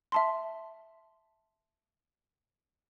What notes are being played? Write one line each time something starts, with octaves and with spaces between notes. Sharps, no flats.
E5 A5 C6